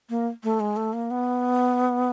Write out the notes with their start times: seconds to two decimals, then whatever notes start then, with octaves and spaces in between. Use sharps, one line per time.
0.10 A#3
0.43 A3
0.60 G#3
0.77 A3
0.93 A#3
1.11 B3